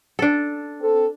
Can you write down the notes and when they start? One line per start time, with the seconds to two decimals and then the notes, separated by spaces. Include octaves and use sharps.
0.19 D4 A4
0.81 C4 A4